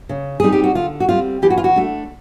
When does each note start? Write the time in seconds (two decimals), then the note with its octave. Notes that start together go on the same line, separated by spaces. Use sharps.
0.09 C#3
0.40 E3 G3 C4 D#4 G#4
0.52 G4
0.64 F#4
0.75 D3 F4
1.00 F#4
1.09 G3 C4 F4
1.42 E3 G4
1.50 F#4
1.58 F4
1.64 F#4
1.76 A3 D4